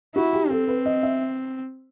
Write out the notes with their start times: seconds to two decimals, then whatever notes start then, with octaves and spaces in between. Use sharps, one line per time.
0.16 E4 F#4
0.33 G4
0.50 C4 A4
0.68 B4
0.86 D#5
1.03 E5